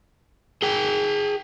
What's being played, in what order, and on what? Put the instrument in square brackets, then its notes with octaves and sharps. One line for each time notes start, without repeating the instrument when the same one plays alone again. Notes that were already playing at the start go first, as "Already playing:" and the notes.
[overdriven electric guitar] G#4 G5